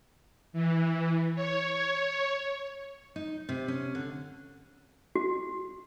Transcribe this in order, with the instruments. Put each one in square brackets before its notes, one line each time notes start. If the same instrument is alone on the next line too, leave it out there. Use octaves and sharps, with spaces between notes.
[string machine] E3
C#5
[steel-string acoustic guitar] D#4
C3
C#4
D3
[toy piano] F#4